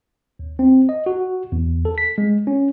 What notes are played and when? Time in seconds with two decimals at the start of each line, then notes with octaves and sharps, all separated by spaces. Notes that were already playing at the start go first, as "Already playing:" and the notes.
0.39 D#2
0.59 C4
0.89 D#5
1.06 F#4
1.52 E2
1.85 A4
1.98 B6
2.18 G#3
2.47 C#4